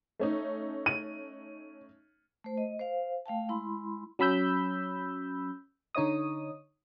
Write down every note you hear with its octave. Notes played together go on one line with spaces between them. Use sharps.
A3 C#4 D#4
D#7
A3 C5
D#5
C5 F5
A3 F5 G5 A5
G#3 E4 B5 C6
F#3 C#4 B5 E6 G6
D3 D#4 C#5 D#5 D#6